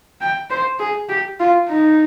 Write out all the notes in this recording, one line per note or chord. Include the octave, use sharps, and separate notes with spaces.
G5
C5
G#4
G4
F4
D#4